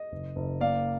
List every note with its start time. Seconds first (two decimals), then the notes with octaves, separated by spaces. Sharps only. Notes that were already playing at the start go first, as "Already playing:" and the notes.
Already playing: D#5
0.12 F#1
0.36 F#1
0.61 A#3 D5 F5